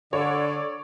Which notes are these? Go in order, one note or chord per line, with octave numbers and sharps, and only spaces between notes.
D3 A4 C#5 D5